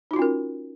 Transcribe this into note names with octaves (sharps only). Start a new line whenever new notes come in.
C#4 D#4 F4 F#4 A#4